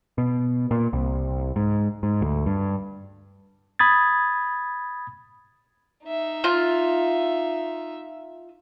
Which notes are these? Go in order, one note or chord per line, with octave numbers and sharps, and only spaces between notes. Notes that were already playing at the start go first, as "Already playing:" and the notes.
B2
A#2
C2
G#2
G#2
D2
G2
B5 D#6 G#6 A6
D#4 E5
F4